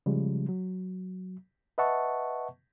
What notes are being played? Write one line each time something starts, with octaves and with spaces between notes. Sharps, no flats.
C#3 F3 G3 G#3
F#3
B4 D#5 E5 F#5 A5 C#6